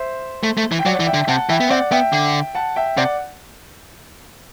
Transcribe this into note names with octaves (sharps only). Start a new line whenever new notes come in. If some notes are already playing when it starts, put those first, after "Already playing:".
Already playing: C5 E5
A3
A3
E3
G5
F#3 D5 F#5
E3
E5 G5
D3
C3 F#5 A5
E3 E5 G5
B3
C4 D5 F#5
B3 E5 G5
D3
F#5 A5
E5 G5
C3 D5 F#5